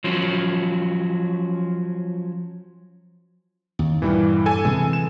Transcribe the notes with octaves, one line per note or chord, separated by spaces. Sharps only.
F3 F#3 C#4
D#2
G2 A#2 E3 G3
A4 G#5
C3 E3 G#3
E7